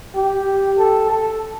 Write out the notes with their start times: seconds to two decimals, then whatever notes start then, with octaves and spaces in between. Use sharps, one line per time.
0.15 G4
0.78 A4
1.10 A4